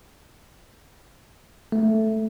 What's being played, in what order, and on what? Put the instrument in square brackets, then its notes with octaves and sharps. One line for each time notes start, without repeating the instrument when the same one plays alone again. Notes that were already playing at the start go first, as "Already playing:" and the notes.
[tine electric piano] A3